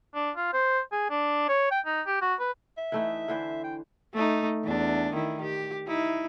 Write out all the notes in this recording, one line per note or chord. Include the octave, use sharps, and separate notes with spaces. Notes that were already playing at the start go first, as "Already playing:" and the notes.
D4
F4
C5
G#4
D4
C#5
G5
D#4
G4
F#4
B4
E5
E3 A3 D#4
D3 E3 C5
G5
A3 D#4
E2 D4
D#3 E4
G4
D#4 E4